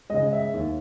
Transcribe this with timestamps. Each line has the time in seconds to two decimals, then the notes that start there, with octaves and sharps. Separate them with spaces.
0.10 C#3 G#3 D#5
0.33 E5
0.54 D#2